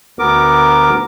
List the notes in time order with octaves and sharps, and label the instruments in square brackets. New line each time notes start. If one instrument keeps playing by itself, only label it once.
[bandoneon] D2 B3 A#4 D6